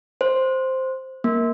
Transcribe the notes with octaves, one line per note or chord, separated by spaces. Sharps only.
C5
A#3